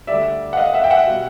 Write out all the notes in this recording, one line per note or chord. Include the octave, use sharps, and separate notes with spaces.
D2 D3 G3 D5 E5
F#5
D#5 F5
E5 F#5
G5
E5 F#5
B2 G3